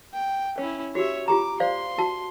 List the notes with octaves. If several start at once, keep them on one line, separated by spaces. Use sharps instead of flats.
G5
C#4 E4 C#5
F#4 G4 C#5 E5
F4 G4 A#5 D6
C5 D5 F5 C6
F#4 A5